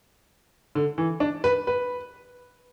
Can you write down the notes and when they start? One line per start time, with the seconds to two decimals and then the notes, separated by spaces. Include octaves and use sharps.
0.75 D3
0.98 E3
1.20 D4
1.44 B4
1.67 B4